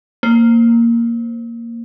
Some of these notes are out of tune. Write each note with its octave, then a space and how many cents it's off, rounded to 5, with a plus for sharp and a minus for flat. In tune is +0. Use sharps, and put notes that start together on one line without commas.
A#3 -5 C5 +0